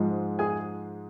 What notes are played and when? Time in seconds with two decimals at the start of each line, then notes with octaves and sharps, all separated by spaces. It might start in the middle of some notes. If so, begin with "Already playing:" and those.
Already playing: G#2 F3 G#3
0.39 G#4 G#5